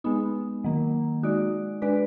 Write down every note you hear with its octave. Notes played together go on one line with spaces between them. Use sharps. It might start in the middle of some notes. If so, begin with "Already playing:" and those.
G#3 B3 D#4
D#3 F#3 A#3
G#3 D#4 F#4 D5
G#3 D4 F#4 B4 D5